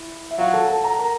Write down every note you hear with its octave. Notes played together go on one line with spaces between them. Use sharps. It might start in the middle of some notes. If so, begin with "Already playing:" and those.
Already playing: E4
E5
F#3 F4 F5
A4 A5
A4 A5
A#5
A#4 A#5